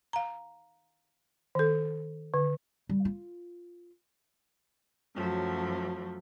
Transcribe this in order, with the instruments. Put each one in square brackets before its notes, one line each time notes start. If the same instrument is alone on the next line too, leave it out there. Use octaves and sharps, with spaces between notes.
[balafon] F5 A#5
D#3 A4
D3
[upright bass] G3
F4
[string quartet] F#2 F3 F#3 A3